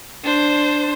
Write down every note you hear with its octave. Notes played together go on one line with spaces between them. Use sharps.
D4 C5